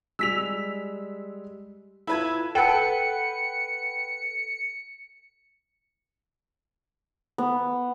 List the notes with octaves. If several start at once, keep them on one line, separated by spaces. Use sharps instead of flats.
G3 G#3 E6 B6 F7
E4 F4 A4 B4 G#6
A4 B4 F#5 G5 C#7
B3